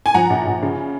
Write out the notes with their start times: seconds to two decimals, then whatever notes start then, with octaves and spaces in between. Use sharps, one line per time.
0.06 G#5
0.14 F3 F#5 A#5
0.30 A#1
0.46 A#1
0.62 C#3